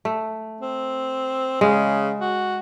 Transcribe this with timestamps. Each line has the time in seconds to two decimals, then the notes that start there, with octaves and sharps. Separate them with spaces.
0.05 A3
0.61 C4
1.61 C#3 G#3
2.21 F#4